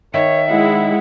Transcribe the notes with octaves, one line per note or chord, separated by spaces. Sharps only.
D#3 C#5 E5
G#3 E4 F#5